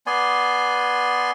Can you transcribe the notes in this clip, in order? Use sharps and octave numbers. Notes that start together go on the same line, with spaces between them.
B3 D5 G#5 C6